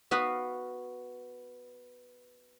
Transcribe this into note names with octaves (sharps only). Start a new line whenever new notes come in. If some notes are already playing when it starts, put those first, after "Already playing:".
B3 F#4 B4 F5